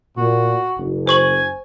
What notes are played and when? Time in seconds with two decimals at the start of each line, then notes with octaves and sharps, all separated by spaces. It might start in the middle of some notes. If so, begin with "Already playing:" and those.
0.18 A#2 F#4
0.79 F#1
1.07 C5 G#5 C#6 F#7